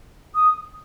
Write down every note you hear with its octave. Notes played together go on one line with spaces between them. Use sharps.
D#6